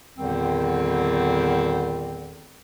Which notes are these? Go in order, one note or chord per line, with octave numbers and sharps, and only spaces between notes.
E2 A#2 D3 D#3 G3 C4